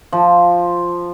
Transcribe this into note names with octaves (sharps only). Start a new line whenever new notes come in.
F3